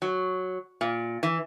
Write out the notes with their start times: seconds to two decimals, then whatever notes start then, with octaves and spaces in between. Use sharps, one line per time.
0.02 F#3
0.81 A#2
1.23 E3